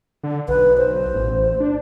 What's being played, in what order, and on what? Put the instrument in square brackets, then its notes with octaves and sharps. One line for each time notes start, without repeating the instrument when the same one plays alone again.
[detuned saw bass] D3
[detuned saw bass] B1 [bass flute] B4
[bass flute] C5
[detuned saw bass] A1
D4